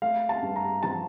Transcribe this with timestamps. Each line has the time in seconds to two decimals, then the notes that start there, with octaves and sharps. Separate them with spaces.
0.02 A3 F5
0.29 A5
0.42 G2
0.56 A#5
0.83 F3 A5